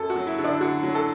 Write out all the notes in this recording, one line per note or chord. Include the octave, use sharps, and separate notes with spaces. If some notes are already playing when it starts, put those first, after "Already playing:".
Already playing: F#2 A4
F#4
F#3
E4
D3
D4
D3 F#4
F#3
A4